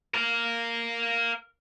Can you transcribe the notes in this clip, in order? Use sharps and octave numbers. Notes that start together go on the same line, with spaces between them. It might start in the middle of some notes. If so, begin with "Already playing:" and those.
A#4 F5